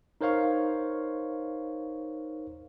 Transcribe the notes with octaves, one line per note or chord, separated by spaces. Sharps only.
D#4 A#4 C5 C#5 F5 C#6